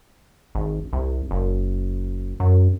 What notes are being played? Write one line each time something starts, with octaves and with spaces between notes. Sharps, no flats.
G#1
C2
F#1
F#2